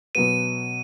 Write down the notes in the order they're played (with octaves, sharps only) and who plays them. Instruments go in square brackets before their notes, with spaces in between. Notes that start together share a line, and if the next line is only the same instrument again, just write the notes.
[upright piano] B2 F#3 B3 [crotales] D#7